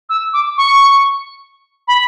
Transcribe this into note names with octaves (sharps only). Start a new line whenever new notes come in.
E6
D6
C#6
B5